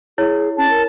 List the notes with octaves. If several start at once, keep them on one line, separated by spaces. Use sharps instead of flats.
E4 G#4 C#5
C#4 A5
A#4